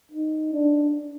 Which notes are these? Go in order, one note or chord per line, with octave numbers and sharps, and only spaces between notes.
D#4
D4